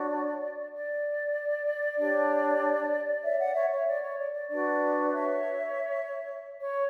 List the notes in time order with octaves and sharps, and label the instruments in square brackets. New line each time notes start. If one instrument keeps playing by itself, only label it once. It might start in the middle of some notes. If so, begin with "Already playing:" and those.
Already playing: [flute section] D4 F#4 C#5 D5
D5
D4 G4 C#5
C#5 E5
D5 F#5
C#5 E5
C#5 E5
D5
C#5
D5
D5
D4 F#4 B4 D5
C#5 E5
C#5